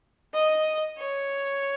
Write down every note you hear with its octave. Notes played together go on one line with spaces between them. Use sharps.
D#5
C#5